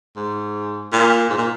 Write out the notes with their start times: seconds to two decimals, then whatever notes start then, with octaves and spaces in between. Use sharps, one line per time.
0.17 G#2
0.92 A#2
1.30 G#2
1.37 A#2